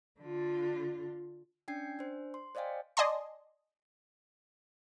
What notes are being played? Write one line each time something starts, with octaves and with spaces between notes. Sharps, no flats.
D3 F4
C#4 D4 G5 G#6 C7
D4 C5
C6
C5 D5 D#5 F5 G5 G#5
D5 D#5 G#5 A5 C6